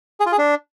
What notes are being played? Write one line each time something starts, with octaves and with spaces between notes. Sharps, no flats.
G#4
F4
G#4
D4